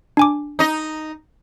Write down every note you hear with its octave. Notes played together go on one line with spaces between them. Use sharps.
D4 G#5 D6
D#4 D#5